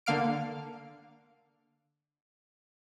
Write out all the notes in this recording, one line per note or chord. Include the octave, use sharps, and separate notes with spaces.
D3 A#3 F5 F6 D7